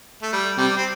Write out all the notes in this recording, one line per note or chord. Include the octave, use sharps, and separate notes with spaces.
A3
G3
C3 G3
C4